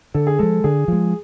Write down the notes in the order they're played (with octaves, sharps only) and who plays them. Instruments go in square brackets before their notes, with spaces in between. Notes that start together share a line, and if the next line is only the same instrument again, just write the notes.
[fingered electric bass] D3 [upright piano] A4
[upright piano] G#4
[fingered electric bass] F3 G#3 [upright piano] A4
[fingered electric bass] D3 [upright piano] G#4
[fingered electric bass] F3 G#3